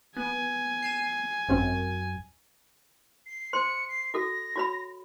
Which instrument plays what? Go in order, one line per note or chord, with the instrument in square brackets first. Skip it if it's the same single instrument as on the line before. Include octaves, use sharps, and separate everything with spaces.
[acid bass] B3 [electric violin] G#5
[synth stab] C7 D#7 E7
[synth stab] G#1 C4 C#4 [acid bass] F#2
[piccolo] C7
[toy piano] C5 C6 [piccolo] C#7
[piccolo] C7
[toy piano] F#4 A4 [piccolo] A#6
[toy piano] F#4 C#5 B5